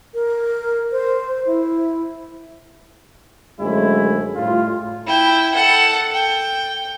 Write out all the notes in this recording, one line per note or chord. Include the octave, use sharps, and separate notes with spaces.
A#4
C5
E4
F#2 D3 F3 G#3 A3 E4
A2 G3 A3 F4
E4 G5
A4 F#5
G5